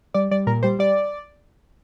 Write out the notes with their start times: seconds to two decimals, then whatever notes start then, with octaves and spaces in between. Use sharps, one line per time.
0.14 G3 D5
0.31 G3 D5
0.47 A#2 A#4
0.63 G3 C5
0.79 G3 D5